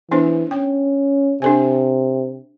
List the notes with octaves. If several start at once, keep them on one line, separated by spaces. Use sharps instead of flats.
E3 B3 D4 C5
C#4 G5
C3 D4 A4 G#5